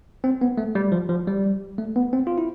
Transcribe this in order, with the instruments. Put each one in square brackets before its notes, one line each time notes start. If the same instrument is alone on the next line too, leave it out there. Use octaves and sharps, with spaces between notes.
[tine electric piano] C4
B3
A3
G3
F3
F3
G3
A3
B3
C4
F4
E4